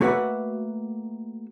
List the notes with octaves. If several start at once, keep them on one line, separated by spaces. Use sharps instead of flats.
A3 A#3 F#4 B4 E5 F#5